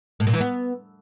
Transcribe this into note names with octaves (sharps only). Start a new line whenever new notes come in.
A2
A#2
E3
B3